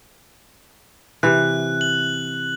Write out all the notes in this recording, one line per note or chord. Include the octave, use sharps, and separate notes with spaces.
C3 E3 F#6
F#7